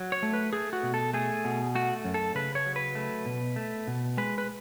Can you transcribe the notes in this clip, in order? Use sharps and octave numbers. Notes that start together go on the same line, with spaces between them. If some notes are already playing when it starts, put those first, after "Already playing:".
Already playing: F#3
C#5
A3
B4
A3 G#4
F#4
B2
A4
A3 G#4
B2
A3 F#4
F#2
A4
C#3 B4
C#5
F#3
B4
A3
B2
A3
B2
G#3 B4
B4